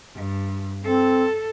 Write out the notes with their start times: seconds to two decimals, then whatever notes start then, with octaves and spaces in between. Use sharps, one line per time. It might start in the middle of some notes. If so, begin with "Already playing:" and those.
0.15 G2
0.84 C4 A4